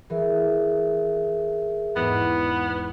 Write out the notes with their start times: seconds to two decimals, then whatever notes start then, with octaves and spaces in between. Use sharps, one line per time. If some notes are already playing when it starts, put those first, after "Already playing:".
0.10 E3 G#4 A#4 E5
1.96 E2 G#2 B3